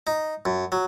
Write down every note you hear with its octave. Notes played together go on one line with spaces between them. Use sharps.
D#4
F#2
F#3